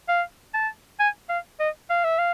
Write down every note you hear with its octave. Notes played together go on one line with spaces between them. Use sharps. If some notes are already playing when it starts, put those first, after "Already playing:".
F5
A5
G#5
F5
D#5
F5
E5
F5